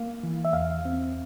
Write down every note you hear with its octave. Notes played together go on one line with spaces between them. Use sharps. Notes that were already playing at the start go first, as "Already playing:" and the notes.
Already playing: A#3 F5
E3
E5
E2 F5
C4